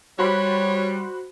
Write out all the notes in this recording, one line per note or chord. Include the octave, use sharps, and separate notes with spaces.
G3 F#4 C5 C#5 B5